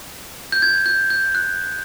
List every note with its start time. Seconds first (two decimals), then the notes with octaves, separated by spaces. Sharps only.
0.52 G6
0.62 G#6
0.86 G6
1.10 G6
1.35 F#6